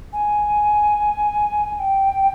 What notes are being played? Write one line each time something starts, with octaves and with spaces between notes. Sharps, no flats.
G#5
G#5
G5